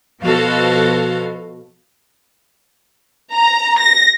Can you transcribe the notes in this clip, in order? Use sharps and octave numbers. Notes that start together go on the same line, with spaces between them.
B2 F3 F#4 A4 F5
A#5
A#6